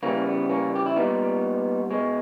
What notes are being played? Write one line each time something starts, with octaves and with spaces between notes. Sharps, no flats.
C#3 E3 G3 A#3 C#4
B3
A#3 C#4
G4
E4
A#2 G3 B3 D#4
B2 G#3